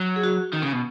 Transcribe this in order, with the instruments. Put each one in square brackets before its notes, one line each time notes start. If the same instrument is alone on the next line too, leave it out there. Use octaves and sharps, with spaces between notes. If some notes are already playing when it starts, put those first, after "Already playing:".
Already playing: [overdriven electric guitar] F#3
[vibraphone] G#4
F#4
[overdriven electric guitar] D#3
C#3
B2